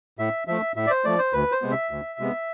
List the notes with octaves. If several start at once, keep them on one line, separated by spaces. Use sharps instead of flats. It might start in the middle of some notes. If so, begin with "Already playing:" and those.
A2 E5
F3 A3 E5
A2 E5
D5
C5
F3 A3 D5
C5
D2 B4
C5
C3 G#3 B3
E5
D2
C3 G#3 B3